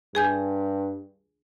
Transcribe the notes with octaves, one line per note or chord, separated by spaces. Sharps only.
G2 G#4 G#5 G6